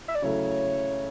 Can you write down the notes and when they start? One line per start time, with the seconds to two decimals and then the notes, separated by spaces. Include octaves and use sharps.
0.08 E5
0.15 D5
0.22 C#3 F#3 A3 E4 A4 C#5